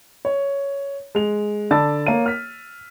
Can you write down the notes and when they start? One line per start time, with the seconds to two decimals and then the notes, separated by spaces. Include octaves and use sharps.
0.25 C#5
1.15 G#3 F7
1.71 D3 D5 A5 B5 E6 A6
2.06 A#3 C#5 D#7
2.26 F6 B6